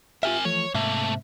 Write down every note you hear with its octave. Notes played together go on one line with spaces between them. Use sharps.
F4 G4 A#4 E5 G#5
E3 F3 A3 C#5
G#2 C3 A3 A#3 E5